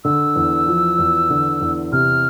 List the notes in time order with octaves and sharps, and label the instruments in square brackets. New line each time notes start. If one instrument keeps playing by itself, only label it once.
[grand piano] D3 [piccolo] E6
[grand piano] E2
F3
E2
D3
E2
[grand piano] C3 [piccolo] F6